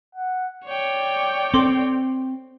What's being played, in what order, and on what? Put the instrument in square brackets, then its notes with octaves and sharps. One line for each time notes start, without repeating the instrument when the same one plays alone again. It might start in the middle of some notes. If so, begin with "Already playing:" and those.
[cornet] F#5
[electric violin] C#5 G5 [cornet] D5
[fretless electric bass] C4 [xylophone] A4 C6 D6